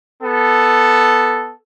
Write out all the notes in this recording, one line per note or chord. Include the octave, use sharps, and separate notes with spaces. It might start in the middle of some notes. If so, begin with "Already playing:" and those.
B3 A4